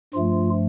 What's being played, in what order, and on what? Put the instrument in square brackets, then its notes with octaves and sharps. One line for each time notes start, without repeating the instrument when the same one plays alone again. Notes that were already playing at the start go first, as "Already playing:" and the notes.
[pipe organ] G2 F3 A3 F4